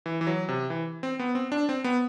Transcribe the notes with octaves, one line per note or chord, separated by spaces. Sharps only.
E3
E3
F#3
C3
E3
C4
B3
C4
D4
C4
B3